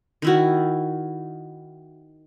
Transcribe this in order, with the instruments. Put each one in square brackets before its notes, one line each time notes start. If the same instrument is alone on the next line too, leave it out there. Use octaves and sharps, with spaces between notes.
[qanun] D#3 E4 F#4